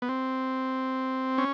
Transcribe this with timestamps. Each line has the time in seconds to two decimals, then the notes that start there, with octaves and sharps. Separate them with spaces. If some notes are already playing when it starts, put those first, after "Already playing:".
0.02 B3
0.09 C4
1.38 C#4